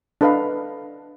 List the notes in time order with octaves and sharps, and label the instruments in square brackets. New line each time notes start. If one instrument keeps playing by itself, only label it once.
[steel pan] D4 A4 B4 D#5 F5